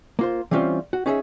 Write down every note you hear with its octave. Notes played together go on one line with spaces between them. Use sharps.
A#3 F4 C5
E3 G3 C4 C#4 F4 C5
F#4
C#4 D#4 G#4 C#5 E5